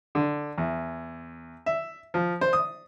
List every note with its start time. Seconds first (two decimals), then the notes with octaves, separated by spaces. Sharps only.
0.15 D3
0.58 E2
1.66 E5
2.14 F3
2.41 C5
2.53 D#6